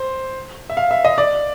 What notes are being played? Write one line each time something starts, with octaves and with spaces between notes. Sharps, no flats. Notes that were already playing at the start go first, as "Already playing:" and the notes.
Already playing: C5
E5
F5
E5
D#5
D5